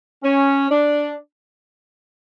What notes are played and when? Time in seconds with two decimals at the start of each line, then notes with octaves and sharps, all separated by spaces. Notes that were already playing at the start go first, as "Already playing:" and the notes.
0.23 C#4
0.71 D4